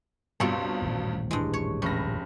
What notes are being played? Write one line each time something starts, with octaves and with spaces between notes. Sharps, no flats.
C#2 G2 B2 C4 A4 C#5
D#1 A1 A#2
G2 E3 G#3
C#5
F1 C#4 B5 A#6